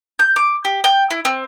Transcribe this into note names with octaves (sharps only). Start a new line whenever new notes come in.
G6
D6
G4
G5
E4
C4